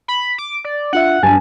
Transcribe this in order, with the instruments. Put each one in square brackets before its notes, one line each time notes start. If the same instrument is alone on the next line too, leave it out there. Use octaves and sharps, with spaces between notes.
[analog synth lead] B5
D6
D5
[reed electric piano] D4 F4 E5 [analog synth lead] F#5
[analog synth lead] G2 [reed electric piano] F#3 A6 [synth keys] G#5 A5